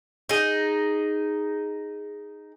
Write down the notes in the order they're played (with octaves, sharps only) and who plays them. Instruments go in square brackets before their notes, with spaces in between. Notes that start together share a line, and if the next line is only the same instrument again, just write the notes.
[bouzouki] D#4 G#4